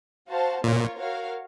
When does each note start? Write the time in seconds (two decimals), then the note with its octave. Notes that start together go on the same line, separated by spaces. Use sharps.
0.28 F#4 C5 F5 A5
0.64 A#2 A#3 F4 A#4 C#5
0.99 F#4 A#4 C#5 F5